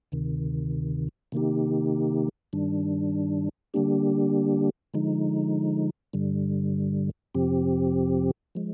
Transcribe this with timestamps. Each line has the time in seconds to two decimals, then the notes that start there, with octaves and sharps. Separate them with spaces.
0.12 D2 C3 D#3
1.32 C3 D#3 A#3 D#4 G4
2.53 G2 D#3 G3 D4
3.74 D3 G3 A#3 D4 G4
4.94 D3 F3 G#3 D#4
6.13 G2 D3 G3
7.35 F2 C3 F3 C4 G4
8.55 F3 G#3